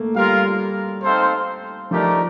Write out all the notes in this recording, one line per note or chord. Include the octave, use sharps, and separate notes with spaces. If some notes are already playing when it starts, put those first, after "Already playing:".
Already playing: A3 A#3
G3 F4 A#4 F5
C4 D#4 A4 C5 F5
F3 A3 D#4 G4 A#4 D5